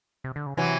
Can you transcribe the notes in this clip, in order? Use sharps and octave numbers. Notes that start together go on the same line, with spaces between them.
C3
D3
C#3
C3 E3 F#3